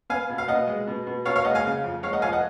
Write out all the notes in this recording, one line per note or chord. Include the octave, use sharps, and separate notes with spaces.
B3 F5 G#5
B2
F5
B2 D#5 F#5
G#3
B2
B2
B2 C#5 F5
C#5 F5
G#3 D#5 F#5
F5 G#5
C#3
F2
G#3 C#5 F5
D#5 F#5
F2 F5 G#5
D#5 F#5